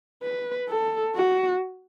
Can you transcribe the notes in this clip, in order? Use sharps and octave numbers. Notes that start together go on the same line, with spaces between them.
B4
A4
F#4